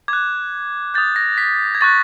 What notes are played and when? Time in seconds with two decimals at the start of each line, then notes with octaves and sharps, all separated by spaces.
0.08 D6 F#6 G#6
0.94 D#6 G6 A6
1.16 A#6
1.38 B6
1.75 G#6
1.81 C#6 F#6 A6